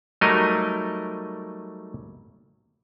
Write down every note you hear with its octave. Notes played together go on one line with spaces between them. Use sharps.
F#3 G3 A3 D#4 A#4 D#5